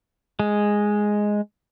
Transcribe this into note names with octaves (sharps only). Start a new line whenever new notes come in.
G#3